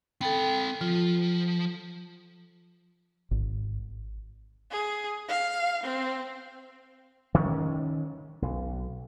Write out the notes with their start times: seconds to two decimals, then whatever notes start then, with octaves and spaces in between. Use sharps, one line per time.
0.21 C4 A4 G5 B5
0.81 F3 F4
3.31 G#1
4.71 G#4
5.29 F5
5.83 C4
7.34 D#3 C#4
8.42 B1